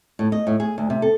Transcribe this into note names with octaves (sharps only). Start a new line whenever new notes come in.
A2
D#5
A2
G#4
D2
C3
A4